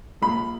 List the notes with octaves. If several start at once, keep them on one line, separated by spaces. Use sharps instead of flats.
A#1 B5